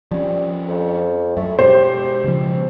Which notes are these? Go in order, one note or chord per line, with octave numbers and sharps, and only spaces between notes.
F3 G3 C#4
F2
F#2 A3
B2 G#3 G4 C5
C#3 F3